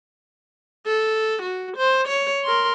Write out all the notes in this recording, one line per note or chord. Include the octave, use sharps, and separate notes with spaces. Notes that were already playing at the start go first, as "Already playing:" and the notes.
A4
F#4
C5
C#5
A#4 C6